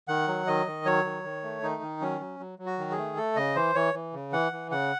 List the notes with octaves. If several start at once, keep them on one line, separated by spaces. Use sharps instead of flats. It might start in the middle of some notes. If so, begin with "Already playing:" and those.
D#3 F#5
F#3
D#3 D#5
D#3
F#3 C#5
D#3
D#3
A3
D#3 D#4
D#3
F#3 C#4
F#3
F#3
F#3
F#4
D#3
G#4
A3
A3 A4
C#3 D#5
E3 C5
E3 C#5
E3
C#3
E3 F#5
E3
C#3 F#5